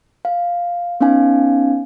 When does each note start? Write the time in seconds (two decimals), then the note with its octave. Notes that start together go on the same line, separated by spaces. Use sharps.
0.25 F5
1.00 B3 C#4 D#4 F5 G#5